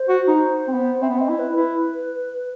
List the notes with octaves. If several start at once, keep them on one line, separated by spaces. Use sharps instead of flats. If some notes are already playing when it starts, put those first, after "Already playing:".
Already playing: C5
F#4
D#4
C4
B3
C4 E5
B3
C4 D#5
E4
B4
E4 B4